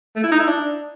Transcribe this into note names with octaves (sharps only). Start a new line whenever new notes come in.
A3
E4
D#4
E4
D4